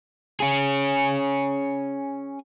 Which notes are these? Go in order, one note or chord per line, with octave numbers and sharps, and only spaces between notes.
C#4 G#4